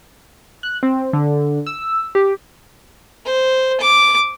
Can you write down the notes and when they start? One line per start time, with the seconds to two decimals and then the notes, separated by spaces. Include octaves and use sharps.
0.63 F#6
0.83 C4
1.13 D3
1.66 E6
2.15 G4
3.25 C5
3.80 D6